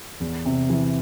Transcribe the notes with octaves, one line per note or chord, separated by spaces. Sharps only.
E2
C3
E3